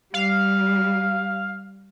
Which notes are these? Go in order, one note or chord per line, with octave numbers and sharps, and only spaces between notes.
G3 F5